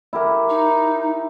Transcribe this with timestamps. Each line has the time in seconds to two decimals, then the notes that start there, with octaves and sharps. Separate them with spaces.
0.13 E4 G4 A#4
0.50 D#4